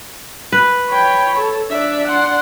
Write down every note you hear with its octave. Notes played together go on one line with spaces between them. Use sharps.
B4
C#5 G5 B5
A4
D4 D5 E5
F#5 C6